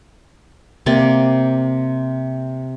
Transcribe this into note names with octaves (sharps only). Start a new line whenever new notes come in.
C3 A#3 D5 G5